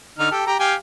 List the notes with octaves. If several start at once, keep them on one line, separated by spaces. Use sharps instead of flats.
D3 D#4 F6
G4 A4
G4 A#5
G4 F5 G#5